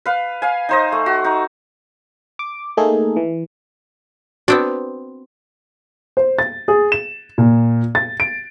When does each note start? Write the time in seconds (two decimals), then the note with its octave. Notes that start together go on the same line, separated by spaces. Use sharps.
0.06 B4 F5
0.42 F5 G#5
0.69 D#4 C5 D#5
0.92 A3
1.06 F#4
1.24 D#4
2.39 D6
2.77 A3 A#3 D#4 G#4 A4
3.16 E3
4.48 B3 C4 D4 F#4
6.17 C5
6.39 A6
6.68 G#4
6.92 E7
7.38 A#2
7.95 A6
8.20 D7